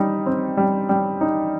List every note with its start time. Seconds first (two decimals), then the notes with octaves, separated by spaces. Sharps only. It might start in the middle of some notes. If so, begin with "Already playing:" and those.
Already playing: G3 D#4
0.26 C4
0.57 G3
0.89 G3
1.21 D#4